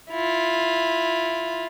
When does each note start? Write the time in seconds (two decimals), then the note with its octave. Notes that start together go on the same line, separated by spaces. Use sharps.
0.11 E4 F4